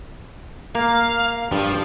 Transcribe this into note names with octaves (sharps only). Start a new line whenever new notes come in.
A#3 F5
G2 F3